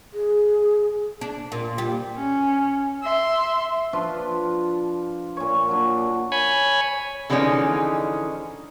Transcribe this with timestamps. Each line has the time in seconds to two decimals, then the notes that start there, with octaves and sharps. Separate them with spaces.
0.14 G#4
1.21 D4
1.52 A#2
1.78 G3
2.16 C#4
3.02 E5 C6
3.93 F3 D4 F4 B4
5.37 A#2 C#5
5.68 F#3 D4
6.32 C#5 G#5 B5
7.30 D3 E3 F3 G#3 C#4 D#4